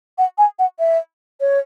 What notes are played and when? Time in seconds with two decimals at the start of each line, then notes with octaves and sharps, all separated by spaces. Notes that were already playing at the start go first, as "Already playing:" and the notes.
0.18 F#5
0.38 G#5
0.59 F#5
0.79 E5
1.40 C#5